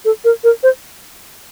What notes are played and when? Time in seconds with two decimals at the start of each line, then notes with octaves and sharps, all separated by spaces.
0.05 A4
0.25 A#4
0.44 A#4
0.63 C5